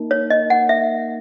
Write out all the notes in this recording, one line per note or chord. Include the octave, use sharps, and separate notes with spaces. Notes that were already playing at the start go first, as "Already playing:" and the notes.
Already playing: A#3 D#4 A#4
C#5
D#5
F#5
E5